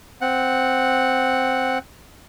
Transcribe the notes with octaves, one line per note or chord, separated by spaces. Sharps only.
C4 F#5